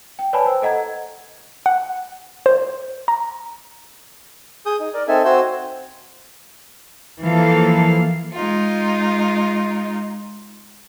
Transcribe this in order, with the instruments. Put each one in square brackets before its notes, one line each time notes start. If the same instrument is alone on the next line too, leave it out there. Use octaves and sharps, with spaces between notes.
[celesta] G5
B4 C#5 D5 G#5 A5 B5
C5 G5 E6
A4 D#5 F#5 A#5 G#6
[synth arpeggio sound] F#5
C5
A#5
[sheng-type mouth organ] G#4 D#6 G6
D#4
A#4 D5
C4 D#4 A4 E5 G#5
C4 F#4 C5 G#5 E6 G6
[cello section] E3 F3 A#3 A4 F5
[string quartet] G#3 D#4 F4